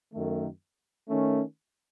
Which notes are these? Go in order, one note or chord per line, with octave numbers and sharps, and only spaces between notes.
F#2 D#3 A3
D#3 A3 C#4